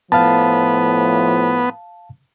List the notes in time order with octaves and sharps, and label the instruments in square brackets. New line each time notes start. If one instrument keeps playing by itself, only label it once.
[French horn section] A2 F3 [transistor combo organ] B3 [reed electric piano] F5 A5